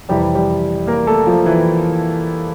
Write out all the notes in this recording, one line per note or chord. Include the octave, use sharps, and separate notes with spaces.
F2 C3 E3 G3 G4
G3 G4
A#3 A#4
A3 A4
F3 F4
E3 E4